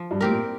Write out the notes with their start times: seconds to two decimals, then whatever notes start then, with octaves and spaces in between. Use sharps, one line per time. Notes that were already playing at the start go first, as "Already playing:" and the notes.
Already playing: F3
0.11 G2
0.21 A2 C4 G4 A#4
0.30 A#2